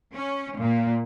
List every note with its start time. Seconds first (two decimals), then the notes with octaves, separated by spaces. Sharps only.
0.15 C#4
0.60 A#2